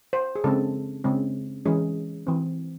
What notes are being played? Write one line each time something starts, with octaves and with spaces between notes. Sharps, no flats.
C5
G#4
C#3 G#3 C4 A4
C#3 G#3 C4
E3 G#3 C#4 G#4
E3 C4